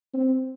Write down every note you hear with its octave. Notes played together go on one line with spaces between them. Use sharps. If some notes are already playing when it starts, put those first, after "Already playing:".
C4